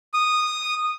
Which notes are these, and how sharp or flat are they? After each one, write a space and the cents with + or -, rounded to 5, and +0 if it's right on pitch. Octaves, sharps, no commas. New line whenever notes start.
D#6 -10